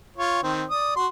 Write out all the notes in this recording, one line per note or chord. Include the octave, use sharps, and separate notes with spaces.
F4 C#5
D#3 C4
D5 D#6
F#4 C6